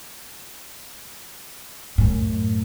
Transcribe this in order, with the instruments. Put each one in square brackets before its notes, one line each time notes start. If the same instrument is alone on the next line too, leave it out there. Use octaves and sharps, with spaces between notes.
[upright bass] F#2 A2